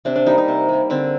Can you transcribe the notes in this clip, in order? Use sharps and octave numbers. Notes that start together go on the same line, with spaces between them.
C3 D4
D4
G3 A#3 D#4
D#4
C3
G3 A#3
D3 C4